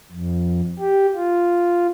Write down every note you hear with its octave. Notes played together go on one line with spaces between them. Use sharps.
F2
G4
F4